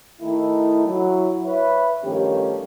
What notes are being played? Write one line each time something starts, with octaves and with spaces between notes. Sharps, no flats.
D#3 A3 D#4 E4
F#3 E4
B4 C#5 E5
G2 D#3 F3 A3 C#4 G4